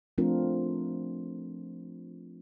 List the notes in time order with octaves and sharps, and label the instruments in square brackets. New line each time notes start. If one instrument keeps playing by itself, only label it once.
[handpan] F3 A3 C4 D4 F4 A#4